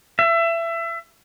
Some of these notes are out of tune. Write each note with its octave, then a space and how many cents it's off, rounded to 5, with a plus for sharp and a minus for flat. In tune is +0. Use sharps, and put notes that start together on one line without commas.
E5 +25